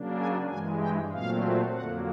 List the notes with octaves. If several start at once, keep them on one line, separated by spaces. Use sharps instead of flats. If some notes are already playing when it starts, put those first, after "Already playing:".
Already playing: C#3 F#3 A#3 D4
G#5
G2 E3 G#3 G#5
G5
A#2 F#3 A3 C4 F5
F2 D3 F#3 A#3 F#5